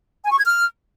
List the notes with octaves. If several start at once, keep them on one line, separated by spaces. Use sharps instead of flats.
G#5
C#6
G#6
F6